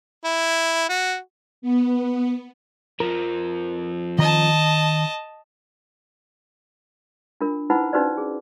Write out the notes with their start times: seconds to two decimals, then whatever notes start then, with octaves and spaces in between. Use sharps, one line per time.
0.25 E4
0.89 F#4
1.62 B3
3.00 F2 F3 A#4
4.19 D#3 D#5 A5 A#5
7.41 D4 F4 A#4
7.70 D#4 E4 B4 C5 F#5 B5
7.93 C#4 D#4 F#4 B4 C5 D5
8.18 G#4